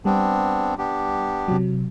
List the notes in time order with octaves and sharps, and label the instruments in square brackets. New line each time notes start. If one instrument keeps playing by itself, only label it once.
[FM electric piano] G3 [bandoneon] B3 C4 D4
[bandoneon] B3 D4 G4
[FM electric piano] C3 F#3